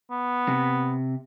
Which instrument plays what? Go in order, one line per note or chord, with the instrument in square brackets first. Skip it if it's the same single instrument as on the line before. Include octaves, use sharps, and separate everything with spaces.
[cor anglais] B3
[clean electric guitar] C3